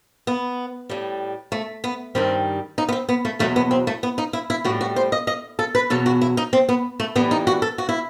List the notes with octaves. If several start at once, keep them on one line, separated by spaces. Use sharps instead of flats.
B3
A2 G3
A3
B3
G2 D#3 G3 C4
D#4
B3
C4
B3
A3
E2 B2 F#3 A3
B3
C4
A3
B3
D#4
E4
E4
A2 G3 F#4
F#4
C5
D#5
D#5
A4
B4
E2 B2 F#3 A4
F#4
E4
D#4
C4
B3
A3
A2 E3 G3 B3
D#4
F#4
A4
F#4
E4